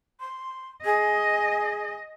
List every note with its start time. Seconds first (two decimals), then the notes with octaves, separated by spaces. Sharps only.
0.20 C6
0.84 G#4 D#5